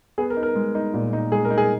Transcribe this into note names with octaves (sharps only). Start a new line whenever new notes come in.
B3 G#4
A#4
D#4
A#4
G#3
D#4
A#2
D#4
G#3 G#4
A#4
D#4
G#4